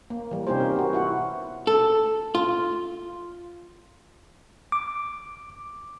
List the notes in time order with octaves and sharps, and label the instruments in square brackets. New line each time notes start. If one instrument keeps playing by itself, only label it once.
[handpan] A#3
E3 G3
C3 C#4 D#4 F4 G4 C5
A#4
B3 F#4
E4 F#4 F#5
[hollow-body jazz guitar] A4
F4
[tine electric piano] D6